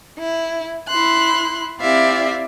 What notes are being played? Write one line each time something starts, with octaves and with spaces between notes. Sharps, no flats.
E4
E4 C6 F#6
C4 E4 G4 D5 E5 F5